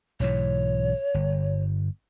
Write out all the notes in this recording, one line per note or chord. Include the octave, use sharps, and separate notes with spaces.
B1 G#2 E3 C#5
G1